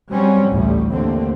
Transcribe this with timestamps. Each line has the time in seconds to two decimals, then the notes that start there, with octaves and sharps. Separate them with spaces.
0.11 F#3 G3 C4 C#4
0.51 A1 D2 A2 G3
0.93 D#2 D3 A3 C4